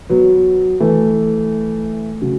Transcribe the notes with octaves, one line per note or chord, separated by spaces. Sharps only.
F#3 B3
E3 A3
C#3 F#3